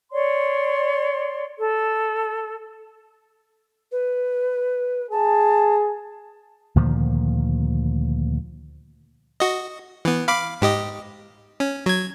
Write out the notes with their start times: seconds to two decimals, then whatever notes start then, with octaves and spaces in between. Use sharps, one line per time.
0.11 C#5 D5 C6
1.58 A4
3.91 B4
5.11 G#4 A5
6.76 D2 A#2 D#3 F3
9.40 F#4 D#5
10.05 E3 B3
10.28 F5 B5 D6
10.62 G#2 G4 D#5
11.60 C#4
11.86 F#3 G#6